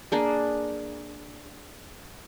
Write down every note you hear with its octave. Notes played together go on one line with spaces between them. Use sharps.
A#3 D4 G#4